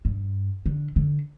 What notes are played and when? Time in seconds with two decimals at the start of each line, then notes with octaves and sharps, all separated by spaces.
0.05 G2
0.66 D3
0.96 D3